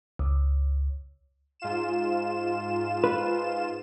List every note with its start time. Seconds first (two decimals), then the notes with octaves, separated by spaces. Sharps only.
0.19 C#2
1.60 G#2 F4 E7
3.04 B4